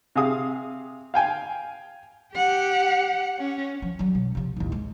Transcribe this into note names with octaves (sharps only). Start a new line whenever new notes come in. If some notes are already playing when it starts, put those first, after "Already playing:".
C3 G#4 F5 D#6
F5 G5 G#5
G4 F#5
C#4
F3
F#3 G3
B2
C3 F3
A1 D#2
G#3